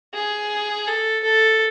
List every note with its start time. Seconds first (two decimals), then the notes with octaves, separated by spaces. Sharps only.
0.14 G#4
0.87 A4
1.23 A4